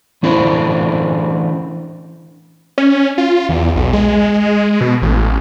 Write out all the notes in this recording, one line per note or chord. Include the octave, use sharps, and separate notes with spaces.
E3 C#4 D4 E4 C5
C#4
F4
E2
B1
G#3
B2
A1